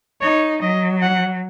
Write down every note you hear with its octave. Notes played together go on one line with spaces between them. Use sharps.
D#4 C#5
F#3 D#5
F#5